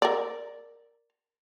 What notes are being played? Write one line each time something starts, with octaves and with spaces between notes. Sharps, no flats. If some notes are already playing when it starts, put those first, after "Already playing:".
A#4 D5